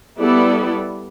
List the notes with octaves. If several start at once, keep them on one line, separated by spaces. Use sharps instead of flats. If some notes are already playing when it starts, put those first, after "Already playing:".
G3 B3 E4 A4 D5